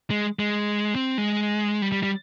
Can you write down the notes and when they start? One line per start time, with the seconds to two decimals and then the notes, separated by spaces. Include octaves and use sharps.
0.10 G#3
0.39 G#3
0.95 C4
1.18 G#3
1.82 G3
1.92 G3
2.03 G3